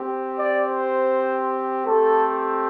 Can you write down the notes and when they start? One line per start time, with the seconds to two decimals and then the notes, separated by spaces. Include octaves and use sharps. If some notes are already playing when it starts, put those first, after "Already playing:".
Already playing: C4 G4
0.37 D5
0.68 C5
1.85 A3 C4 G4 A4